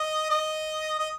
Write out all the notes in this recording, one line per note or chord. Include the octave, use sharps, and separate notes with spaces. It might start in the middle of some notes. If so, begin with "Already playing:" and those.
Already playing: D#5
D#5
D#5